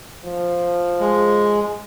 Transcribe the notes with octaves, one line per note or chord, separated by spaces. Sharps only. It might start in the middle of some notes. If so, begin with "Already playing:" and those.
F3
G#3